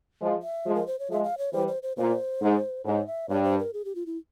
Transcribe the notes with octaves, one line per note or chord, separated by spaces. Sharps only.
F3 G#3
E5
F3 G#3
A#4
C5
C#5
F3 G#3 E5
F5
C#5
E3 G3 C5
C5
C5
A#2 C5
G#2
G#2 C#5
E5
G2 C#5
C5
A#4
G#4
G4
F4
E4